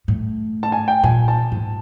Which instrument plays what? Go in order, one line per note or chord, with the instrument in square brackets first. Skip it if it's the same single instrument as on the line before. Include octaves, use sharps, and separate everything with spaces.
[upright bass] A2
[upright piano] A5
G#5
G5
[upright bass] A#2 [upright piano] G#5
[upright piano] A5
[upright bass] G#2